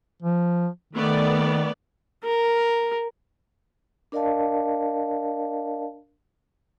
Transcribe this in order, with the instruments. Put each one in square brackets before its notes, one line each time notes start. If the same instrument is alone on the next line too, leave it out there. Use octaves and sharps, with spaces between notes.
[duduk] F3
[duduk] D#3 [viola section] A3 B3 D5
[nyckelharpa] A#4
[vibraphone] D4 A#4 D5 D#5 F5 A5